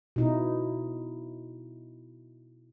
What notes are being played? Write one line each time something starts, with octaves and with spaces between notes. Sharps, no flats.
B2 D#4 E4